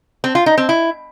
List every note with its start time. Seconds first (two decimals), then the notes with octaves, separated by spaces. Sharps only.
0.24 C4
0.35 F4
0.46 D#4
0.58 C4
0.69 E4